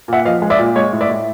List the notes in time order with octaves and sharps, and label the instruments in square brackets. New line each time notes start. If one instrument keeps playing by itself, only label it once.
[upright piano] A#2 E5 F#5
F3 D#5 F5
G#3
D5 E5
A#2
G#3 C#5 D#5
A2
D5 E5
A2